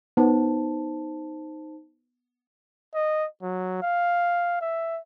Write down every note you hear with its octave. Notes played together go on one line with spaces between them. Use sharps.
B3 D#4 C5 A5
D#5
F#3
F5
E5